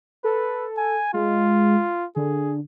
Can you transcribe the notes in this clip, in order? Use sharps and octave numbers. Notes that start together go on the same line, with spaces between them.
A4 B4
G#5
G#3 F4
D3 G#4